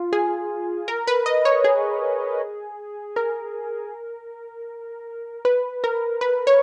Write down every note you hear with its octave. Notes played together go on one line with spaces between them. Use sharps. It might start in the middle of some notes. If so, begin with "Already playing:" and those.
Already playing: F4
G#4
A#4
B4
D#5
C#5
G#4
A#4
B4
A#4
B4
C#5